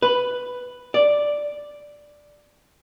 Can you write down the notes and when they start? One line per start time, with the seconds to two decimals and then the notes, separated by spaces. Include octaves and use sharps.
0.02 B4
0.94 D5